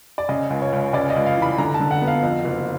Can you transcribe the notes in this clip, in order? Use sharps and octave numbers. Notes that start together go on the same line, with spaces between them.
D5
C#3 D#5
C#2
C#5
C#2
C#3 D5
D#5
C#2
F5
E3
B5
D3 A#5
A5
D3
F#5
B3
F5
F2
F#1